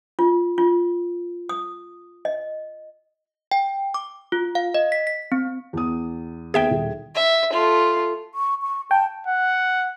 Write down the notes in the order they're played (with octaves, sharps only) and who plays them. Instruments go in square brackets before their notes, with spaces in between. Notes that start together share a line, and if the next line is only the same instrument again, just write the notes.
[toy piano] F4
F4
D#6
D#5
[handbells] G5
D6
F4
F5
D#5
B6
B6
C4
[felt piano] E2 D#6
[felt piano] D#2 B3 G#6 [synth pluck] G#4 E5 G5
[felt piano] D#1
[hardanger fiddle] E5
A3 F4
[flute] C#6
C#6
[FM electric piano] G5 [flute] A5
[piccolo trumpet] F#5